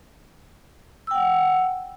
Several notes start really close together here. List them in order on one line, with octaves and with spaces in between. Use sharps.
E6 G5 F#5